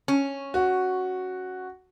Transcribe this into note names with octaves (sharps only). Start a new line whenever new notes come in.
C#4
F#4